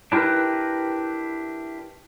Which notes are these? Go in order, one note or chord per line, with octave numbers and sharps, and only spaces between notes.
D4 E4 G4 A#4 B4